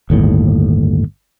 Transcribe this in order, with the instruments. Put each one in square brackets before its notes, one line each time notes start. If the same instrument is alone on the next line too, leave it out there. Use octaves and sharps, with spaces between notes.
[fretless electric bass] G1 D#2 A2